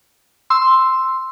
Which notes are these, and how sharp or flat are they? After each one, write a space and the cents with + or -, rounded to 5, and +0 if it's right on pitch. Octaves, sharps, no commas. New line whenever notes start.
C6 +0 E6 +0